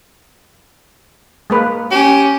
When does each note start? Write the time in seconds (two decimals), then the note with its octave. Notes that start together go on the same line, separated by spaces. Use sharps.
1.50 G#3 A#3 B4
1.91 C#4 G4